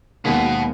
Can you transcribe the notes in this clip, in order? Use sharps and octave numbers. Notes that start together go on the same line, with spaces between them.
D#2 B2 D#3 G#3 B3 D#4